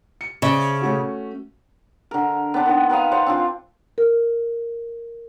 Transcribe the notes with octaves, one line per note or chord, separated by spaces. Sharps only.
C#7
C#3 C5 D5 E5
A3 C#4 F#4
D3 A#4
B3 C4 D4
D#3 D#5
A#4 B4 D#5 F5
C5 D5 F#5
C4 D4 F4
A#4